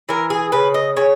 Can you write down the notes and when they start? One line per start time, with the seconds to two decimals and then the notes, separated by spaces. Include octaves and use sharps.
0.09 E3 A#4
0.30 G#4
0.52 C#3 B4
0.74 D#5
0.97 C#3 C#5